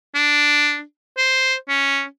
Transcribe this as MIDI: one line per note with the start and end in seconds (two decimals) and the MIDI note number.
0.15 0.82 62
1.18 1.55 72
1.68 2.05 61